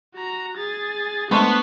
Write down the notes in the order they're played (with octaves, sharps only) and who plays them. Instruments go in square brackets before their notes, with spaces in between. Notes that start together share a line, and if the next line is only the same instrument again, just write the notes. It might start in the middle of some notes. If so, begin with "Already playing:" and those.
[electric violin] F#4 A#5
G#4 A6
[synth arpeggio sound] G#3 A3 [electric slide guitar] B3 [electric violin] D4 F#6 [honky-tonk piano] A4 C5 C#6